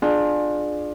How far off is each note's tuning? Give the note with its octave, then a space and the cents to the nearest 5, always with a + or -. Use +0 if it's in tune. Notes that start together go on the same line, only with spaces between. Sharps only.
D4 +20 F4 +20 G#4 +15